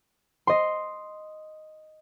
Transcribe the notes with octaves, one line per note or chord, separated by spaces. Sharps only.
D#5 C6